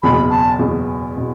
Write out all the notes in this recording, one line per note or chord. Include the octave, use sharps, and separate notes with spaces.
F#1 E2 B2 B5
A5
F#1 E2 B2
B2